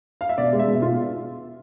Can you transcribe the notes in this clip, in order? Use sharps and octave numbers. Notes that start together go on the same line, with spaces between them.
F5
E5
B2 D5
G#3
E5
B2
B2 F4